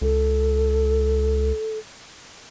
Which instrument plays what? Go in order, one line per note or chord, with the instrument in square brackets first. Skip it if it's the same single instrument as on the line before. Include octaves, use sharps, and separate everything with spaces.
[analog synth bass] C#2 [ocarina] A4